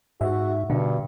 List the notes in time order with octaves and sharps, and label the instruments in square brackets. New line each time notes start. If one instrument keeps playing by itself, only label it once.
[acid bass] G#2 [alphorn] F#4 [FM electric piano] E5
[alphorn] G2 [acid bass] B2 [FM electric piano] D3